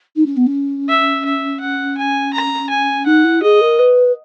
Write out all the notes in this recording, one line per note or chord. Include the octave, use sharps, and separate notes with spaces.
D#4
C#4
B3
C#4
E5
E5
F#5
G#5
A#5
G#5
D#4 F#5
E4
G#4 D#5
A#4
B4